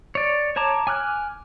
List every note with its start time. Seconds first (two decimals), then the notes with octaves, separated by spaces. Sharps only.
0.15 C#5 D5
0.56 C#5 A5 A#5 D6
0.87 G#5 D6 F6 F#6